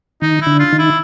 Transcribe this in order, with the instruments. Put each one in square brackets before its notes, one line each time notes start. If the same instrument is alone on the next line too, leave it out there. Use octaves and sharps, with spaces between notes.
[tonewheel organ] D#3 [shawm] D#4
[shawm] E4
[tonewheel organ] D3
[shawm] F4
[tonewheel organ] D#3
[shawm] E4